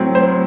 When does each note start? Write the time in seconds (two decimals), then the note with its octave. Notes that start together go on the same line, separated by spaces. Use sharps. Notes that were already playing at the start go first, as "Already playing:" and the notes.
Already playing: A2 F#3 C4
0.15 C5